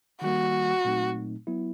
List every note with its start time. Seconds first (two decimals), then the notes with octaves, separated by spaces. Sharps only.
0.22 D#3 G3 A#3 F#4
0.85 A#2 F#3 A3 C4 D#4
1.47 F#3 B3 E4